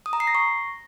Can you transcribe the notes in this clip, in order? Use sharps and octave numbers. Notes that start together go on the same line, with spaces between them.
D#6
A#5
C7
A#6
C#6